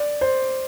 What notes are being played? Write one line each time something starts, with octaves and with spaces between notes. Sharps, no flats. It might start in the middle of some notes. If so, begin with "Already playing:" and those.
Already playing: D5
C5